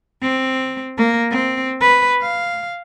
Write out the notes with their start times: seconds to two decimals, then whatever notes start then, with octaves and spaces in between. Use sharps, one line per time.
0.22 C4
0.97 A#3
1.30 C4
1.80 B4
2.21 F5